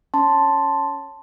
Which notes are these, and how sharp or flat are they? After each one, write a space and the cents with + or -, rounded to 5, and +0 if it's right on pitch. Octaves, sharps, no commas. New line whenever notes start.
C#4 +0 A5 +0 C6 +0